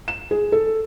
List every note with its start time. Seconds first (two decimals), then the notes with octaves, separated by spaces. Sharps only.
0.08 E7
0.31 G#4
0.52 A4